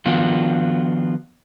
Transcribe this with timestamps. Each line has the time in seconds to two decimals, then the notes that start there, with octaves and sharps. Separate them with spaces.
0.06 D#3 F3 B3 D4 F4 F#4